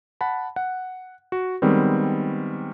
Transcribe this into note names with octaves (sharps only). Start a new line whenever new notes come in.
F#5 A5 B5
F#5
F#4
D#3 G3 G#3 B3 C4